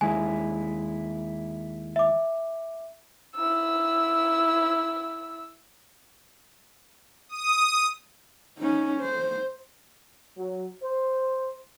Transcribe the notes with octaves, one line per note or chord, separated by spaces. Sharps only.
D#2 G#3 E4 G#5
E5 D6
E4 E6
D#6
C#4 D#4
C5
F#3
C5